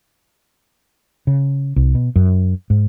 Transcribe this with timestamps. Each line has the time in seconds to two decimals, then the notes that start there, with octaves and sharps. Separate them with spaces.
1.27 C#3
1.76 C2
1.95 B2
2.16 F#2
2.70 G#2